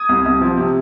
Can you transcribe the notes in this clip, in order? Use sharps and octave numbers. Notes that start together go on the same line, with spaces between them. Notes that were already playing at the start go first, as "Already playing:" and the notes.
Already playing: D#6 G#6
C2
C2
F3
C3